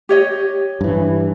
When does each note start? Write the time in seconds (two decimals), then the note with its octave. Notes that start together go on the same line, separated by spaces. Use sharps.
0.09 G4 C#5 D#5
0.81 G2 E3